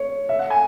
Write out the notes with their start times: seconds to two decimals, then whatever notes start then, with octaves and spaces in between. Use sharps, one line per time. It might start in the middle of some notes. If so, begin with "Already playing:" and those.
Already playing: C#5
0.29 E5
0.39 F#5
0.50 G#5